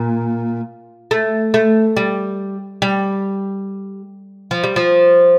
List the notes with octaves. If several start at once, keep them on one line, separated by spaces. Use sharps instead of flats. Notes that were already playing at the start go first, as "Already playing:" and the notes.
Already playing: A#2
A3
A3
G3
G3
F3
G3
F3